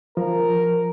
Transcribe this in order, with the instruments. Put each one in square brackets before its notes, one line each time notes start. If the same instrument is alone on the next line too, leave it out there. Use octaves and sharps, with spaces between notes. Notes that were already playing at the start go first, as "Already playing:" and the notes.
[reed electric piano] F3 [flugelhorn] A#4